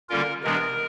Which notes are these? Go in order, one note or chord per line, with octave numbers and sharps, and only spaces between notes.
D3 G3 A#3 C#4 F4 A#4
C3 E3 G#3 B3 D4 A#4